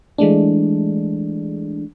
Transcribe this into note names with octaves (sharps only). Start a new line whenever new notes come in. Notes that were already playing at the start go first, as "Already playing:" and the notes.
E3 G#3 A3 D4